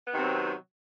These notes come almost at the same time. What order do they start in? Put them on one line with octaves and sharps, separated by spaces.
B3 D#3 C3 C4 F#3